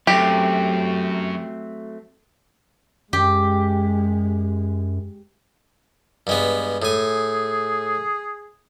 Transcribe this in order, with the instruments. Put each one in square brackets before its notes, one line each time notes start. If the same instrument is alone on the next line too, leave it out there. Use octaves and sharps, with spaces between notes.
[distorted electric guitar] F#2 [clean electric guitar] F#3 A3 C4 [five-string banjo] G4
[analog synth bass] F#2 [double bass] G#3 [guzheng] G4
[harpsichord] G2 G#3 B3
[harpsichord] A2 G#5 [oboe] G#4